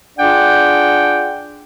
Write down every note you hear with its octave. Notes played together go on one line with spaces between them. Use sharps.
D4 F4 G#4 D5 F#5 G5